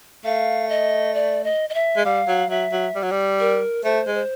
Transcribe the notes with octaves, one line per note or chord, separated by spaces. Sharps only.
A3 F5
D#5
D5
D#5
D#5
E5
G#3
G3 F5
F#3
F#3 E5
F#3
G3
F#3
G3
A#4
A3 C5
G#3
C5